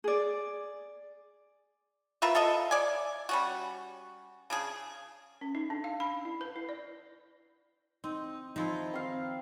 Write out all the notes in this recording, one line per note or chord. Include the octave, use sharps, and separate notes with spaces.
G#4 D5
F4 A#4 B4 E5
F4 A4 D#5 E5
D5 G#5
G3 C#4 F#4
C#3 D4 G#4
C#4
D#4
D4
F5
B5
E4
B4
E4
D5
C4 D#4
D#3 F3 D#4 E4
C4 F5